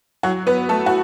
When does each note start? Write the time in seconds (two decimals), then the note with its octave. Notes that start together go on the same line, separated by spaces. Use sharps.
0.23 F#3 F#4
0.47 B3 B4
0.69 A3 A4
0.86 F#4